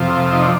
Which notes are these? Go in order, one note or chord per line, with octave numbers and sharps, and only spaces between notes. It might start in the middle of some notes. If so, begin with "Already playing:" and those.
Already playing: F2 C3 F3
D#4
D4